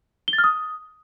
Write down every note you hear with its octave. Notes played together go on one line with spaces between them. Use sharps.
G7
A6
F6
D#6